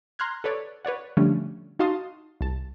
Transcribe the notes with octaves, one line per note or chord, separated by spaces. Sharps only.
A#5 C6 F6 F#6 G#6
A4 B4 C#5 D5
B4 C#5 D5 F#5
D3 F3 G3 A3 C#4 D4
D#4 F#4 F5 A5 C6 D#6
C2 A5